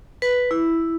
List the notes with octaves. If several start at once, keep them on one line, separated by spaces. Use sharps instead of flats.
B4
E4